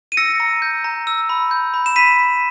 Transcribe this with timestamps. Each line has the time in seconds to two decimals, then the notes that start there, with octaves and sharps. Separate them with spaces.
0.12 D#7
0.17 E6 A#6 C#7
0.40 A#5
0.62 G6
0.84 A#5
1.07 E6
1.29 B5
1.51 G6
1.74 B5
1.86 E7
1.96 B5 B6 D#7